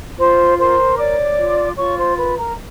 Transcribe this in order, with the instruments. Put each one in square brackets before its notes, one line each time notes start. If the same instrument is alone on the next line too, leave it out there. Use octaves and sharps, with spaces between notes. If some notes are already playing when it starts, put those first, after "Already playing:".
[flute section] F4 C5 C6
A#4 C5 C6
C#5 D5 D6
F4
F4 C#5 C#6
C5 C6
A#4 B4 B5
A#4 A#5